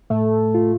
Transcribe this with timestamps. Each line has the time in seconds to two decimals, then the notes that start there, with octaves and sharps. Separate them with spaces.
0.10 A2 A3
0.55 F4